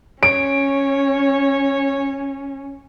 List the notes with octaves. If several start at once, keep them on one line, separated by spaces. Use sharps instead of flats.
C#4 C#5 D7